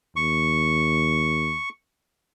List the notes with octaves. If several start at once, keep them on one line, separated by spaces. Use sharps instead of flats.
D#2 C#6